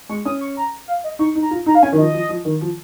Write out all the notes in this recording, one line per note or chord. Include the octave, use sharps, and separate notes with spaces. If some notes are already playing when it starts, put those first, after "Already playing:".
G#3 C#6
C#4 D#6
C#6
A#5
F5
D#5
D#4 C#6
D#4
A#5
F4
D#4 A#5
F5
C#4 G#5
D#3
F3 D#5
F3
F3
D#3
F3